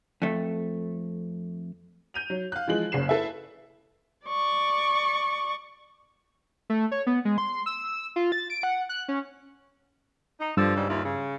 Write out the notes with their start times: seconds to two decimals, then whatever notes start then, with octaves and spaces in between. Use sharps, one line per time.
0.22 F2 A3
2.14 G6 D#7 F7
2.30 F#3
2.52 F5 F#6
2.68 E3 F3 G#3 F#7
2.92 F#1 C#3 C7 E7
3.09 E4 A4 B4 E5
4.27 D5 C#6
6.70 A3
6.92 C#5
7.07 B3
7.25 G#3
7.38 C6
7.66 E6
8.16 F4
8.32 A6
8.50 D7
8.63 F#5
8.89 F#6
9.08 C#4
10.40 D#4
10.57 G2 D3 F3 E6
10.76 G#2 C#3 G3
10.89 D#2 E4 F4
11.05 C#3